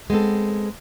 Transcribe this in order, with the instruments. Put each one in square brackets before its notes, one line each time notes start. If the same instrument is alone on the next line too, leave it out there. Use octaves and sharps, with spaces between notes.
[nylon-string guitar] G#3 B3 C4 A4